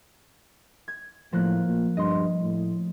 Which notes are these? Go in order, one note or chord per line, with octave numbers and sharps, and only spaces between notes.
G#6
A2 F3 A#3 F#6
A#2
G2 D#5 C6
A2